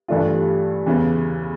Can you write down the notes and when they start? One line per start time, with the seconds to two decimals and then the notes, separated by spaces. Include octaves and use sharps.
0.08 G2 E3 A3 D4 F4
0.86 E2 C#3 E3